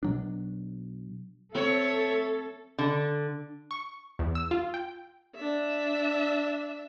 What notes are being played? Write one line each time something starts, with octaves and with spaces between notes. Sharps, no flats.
B2 F#3 D4
C4 A4 C#5 E5
D3
C#6
E2
E6
F4
G5
D4 E5